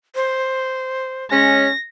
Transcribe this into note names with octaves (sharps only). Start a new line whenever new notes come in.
C5
G#3 C#4 A#6